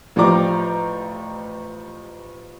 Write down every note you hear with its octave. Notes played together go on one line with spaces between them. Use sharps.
A1 F3 G4 D5 A#5 D6